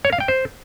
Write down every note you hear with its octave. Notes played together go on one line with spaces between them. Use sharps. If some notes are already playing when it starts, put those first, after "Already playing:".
C#5
F5
G5
C5